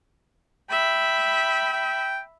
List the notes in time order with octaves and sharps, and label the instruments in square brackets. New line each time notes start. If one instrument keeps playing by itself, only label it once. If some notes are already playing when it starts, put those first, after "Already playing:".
[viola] E5 B5 [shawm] G5
[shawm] G5